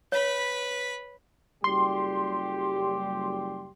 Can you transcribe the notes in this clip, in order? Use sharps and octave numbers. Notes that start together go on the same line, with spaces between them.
B4 C#5 B5
F#1 G3 G4 C6